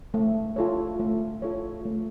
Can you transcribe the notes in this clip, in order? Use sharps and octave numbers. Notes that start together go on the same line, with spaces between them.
A3
F4 A4 C#5
A3
F4 A4 C#5
A3